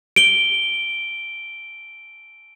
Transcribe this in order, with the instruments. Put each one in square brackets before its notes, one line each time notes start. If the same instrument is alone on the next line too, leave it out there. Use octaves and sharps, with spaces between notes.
[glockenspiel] D7 G7